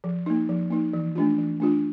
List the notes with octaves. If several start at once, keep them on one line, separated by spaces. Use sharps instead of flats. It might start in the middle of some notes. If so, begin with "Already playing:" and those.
F3
A#3 D#4
F3
A#3 D#4
E3
A3 D4 F4
E3
A3 D4 F4